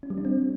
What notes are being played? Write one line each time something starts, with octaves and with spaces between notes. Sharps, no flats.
C#4
G3
D4
C4